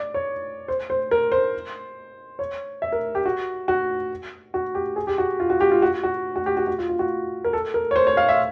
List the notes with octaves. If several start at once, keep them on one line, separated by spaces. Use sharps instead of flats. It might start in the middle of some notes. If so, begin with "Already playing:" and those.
Already playing: D5
C#5
C5
C5
A#4
C5
C#5
E5
A#4
G4
F#4
F#4
F#4
G4
G#4
G4
F#4
F4
F#4
G4
F4
F#4
F#4
F#4
G4
F#4
F#4
F4
F4
F#4
A#4
A4
A#4
C#5
C5
C#5
F5
E5